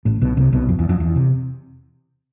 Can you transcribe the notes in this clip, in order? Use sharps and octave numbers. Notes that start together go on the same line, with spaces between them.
A1 A2
B1 B2
C2 C3
B1 B2
F2
E2
F2
E2
C3